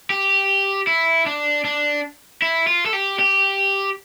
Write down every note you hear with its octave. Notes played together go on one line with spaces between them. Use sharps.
G4
E4
D4
D4
E4
F4
A4
G4
G4